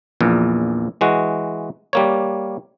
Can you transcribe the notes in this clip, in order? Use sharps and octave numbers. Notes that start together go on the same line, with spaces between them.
A#1 E2 A#2
E3 G#3 F#4
G3 A#3 C#5